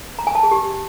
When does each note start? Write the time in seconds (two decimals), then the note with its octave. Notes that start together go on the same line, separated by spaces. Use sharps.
0.19 A#5
0.27 G#5
0.35 A5
0.43 G#4
0.51 G4